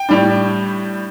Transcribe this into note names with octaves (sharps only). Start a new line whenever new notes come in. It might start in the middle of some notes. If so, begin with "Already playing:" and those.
Already playing: G5
A2 G3 D4